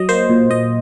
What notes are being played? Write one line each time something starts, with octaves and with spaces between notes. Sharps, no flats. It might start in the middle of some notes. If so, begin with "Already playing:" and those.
Already playing: F#3 D#5
A#3 C5
A#2
A#2 D#5